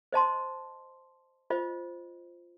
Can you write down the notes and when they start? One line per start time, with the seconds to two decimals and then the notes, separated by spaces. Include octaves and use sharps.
0.12 C5 D#5 A5 C6
1.50 F4 C5 D#5